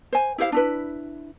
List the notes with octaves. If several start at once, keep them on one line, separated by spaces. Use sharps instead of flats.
C5 G#5
E4 G4 C5 F5
D4 E4 B4